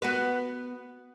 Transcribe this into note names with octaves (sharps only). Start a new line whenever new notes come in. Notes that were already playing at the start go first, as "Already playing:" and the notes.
B3 F#4 B4